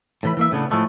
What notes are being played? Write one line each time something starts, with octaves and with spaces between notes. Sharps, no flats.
A2 E3 B5
E3 A#3 E5
A2 C#3 B3 D4
A2 F3 G#3 A3 B3